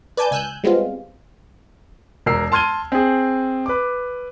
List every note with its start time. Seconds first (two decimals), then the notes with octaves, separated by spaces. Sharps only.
0.17 B4 D5 G#5 A5 G6 A6
0.31 C#2 G#5 E6 F#6 G6
0.63 G3 G#3 B3 C4 F4
2.26 E1 A#4 E6 C7
2.52 A5 C6 F6 G#6 D#7 G7
2.92 C4 G#4
3.66 B4 D6